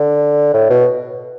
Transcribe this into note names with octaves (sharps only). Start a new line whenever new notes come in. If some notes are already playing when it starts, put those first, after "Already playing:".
Already playing: D3
A2
B2